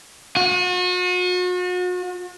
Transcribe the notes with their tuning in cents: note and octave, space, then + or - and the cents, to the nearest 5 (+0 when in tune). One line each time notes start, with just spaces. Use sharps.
F#4 -40